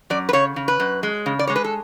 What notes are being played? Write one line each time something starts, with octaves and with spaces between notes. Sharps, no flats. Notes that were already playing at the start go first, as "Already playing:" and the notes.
F#2 D5
B4
C#3 C#5
C#3
B4
F#2
G#3
C#3
D5
G#3 C#5
B4
A4